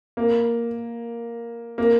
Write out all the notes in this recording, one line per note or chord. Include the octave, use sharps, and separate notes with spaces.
A#3
A#3